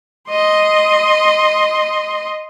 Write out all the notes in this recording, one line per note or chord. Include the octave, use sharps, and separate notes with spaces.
D#5 C6